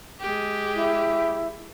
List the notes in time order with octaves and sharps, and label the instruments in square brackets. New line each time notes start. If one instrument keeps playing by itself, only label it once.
[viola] G#3 G4
[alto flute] E4